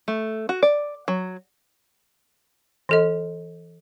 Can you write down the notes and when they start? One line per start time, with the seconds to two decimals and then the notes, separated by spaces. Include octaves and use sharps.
0.08 A3
0.49 F#4
0.63 D5
1.08 F#3
2.89 E3 A4 D#5